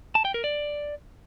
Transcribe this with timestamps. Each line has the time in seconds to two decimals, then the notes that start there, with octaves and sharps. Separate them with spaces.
0.15 A5
0.25 G5
0.34 A#4
0.44 D5